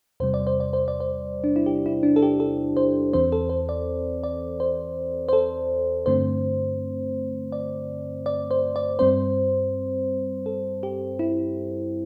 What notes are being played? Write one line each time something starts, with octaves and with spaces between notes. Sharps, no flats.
E2 C3 G3 C5
D5
C5
D5
C5
D5
C5
D4
E4
G4
E4
D4
A4
G4
A4
C5
E2 E3 C4 C5
A4
C5
D5
D5
C5
C5
A4
G2 D3 A3 C4 C5
D5
D5
C5
D5
G2 G3 C4 C5
A4
G4
E4